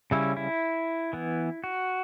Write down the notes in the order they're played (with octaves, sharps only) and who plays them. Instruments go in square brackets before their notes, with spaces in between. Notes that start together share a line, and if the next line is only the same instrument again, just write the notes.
[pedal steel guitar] C#3 G3 C#4 E4
E4
E3 B3
F#4